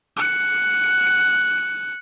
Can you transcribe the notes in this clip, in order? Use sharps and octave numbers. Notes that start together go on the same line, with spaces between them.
F#6 C#7